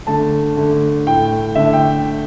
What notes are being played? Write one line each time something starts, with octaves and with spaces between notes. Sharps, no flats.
D3 A3 A5
D3 A3
A2 A3 G5
D3 A3 E5
G5